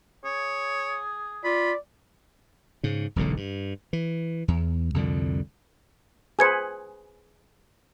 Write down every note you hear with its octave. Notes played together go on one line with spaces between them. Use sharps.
G#4 C#5
F4 D5 B5
G#2 C#3
E1 B1 A2 D3
G2
E3
E2
C2 F2 D3 G3
G#4 B4 C5 G#5 G#6 C#7